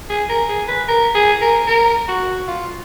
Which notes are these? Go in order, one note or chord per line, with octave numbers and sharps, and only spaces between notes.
G#4
A#4
G#4
B4
A#4
G#4
A#4
A#4
F#4
F4